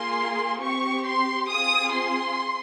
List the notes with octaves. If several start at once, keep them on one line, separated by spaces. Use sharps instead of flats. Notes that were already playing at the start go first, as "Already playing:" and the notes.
Already playing: A#3 F4 G#4 C6
C4 G4 C#6
C6
C4 F4 G#4 D#6
C6